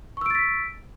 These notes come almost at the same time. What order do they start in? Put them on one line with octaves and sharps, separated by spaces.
C#6 E6 D7 A6 B6